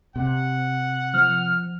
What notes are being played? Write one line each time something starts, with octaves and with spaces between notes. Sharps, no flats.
C3 F#5
F3 F6